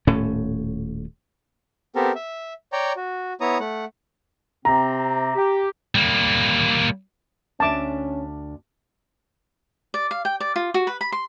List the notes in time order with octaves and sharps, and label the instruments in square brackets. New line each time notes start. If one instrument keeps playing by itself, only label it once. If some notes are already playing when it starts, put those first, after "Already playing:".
[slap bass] D#1 A2 A3 C#4
[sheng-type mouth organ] B3 C4 G4 A4 A#4
E5
C#5 D5 G5 A#5
F#4
B3 E4 C#5 A#5 D#6
A3 F#5
[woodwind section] C3 C4 [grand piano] A#5
[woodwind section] G4
[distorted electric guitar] G3 A#3
[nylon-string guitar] D2 D4 E5 [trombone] C#4 [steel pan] A5 D6
[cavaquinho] D5
F5
G5
D5
F4
F#4
B4
B5
C6